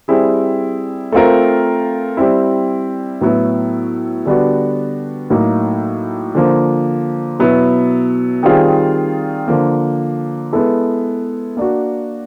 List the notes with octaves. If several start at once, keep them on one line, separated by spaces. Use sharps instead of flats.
G3 C4 E4 G#4
A3 C4 F4 A#4
G3 C4 E4
A2 F#3 B3 E4
D3 G3 B3 D4 F#4
A2 F#3 A#3 D#4
D3 F3 A#3
B2 F#3 B3 E4
D#3 G3 C4 F4 G#4
D3 F3 A#3
G#3 B3 E4 A4
A#3 D4 F#4